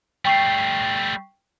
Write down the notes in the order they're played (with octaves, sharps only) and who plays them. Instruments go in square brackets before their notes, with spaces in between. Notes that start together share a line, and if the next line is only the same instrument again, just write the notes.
[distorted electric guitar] G3 A3 [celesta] G5 C#6 C7